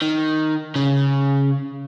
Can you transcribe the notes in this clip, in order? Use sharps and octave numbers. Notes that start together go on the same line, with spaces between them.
D#3
C#3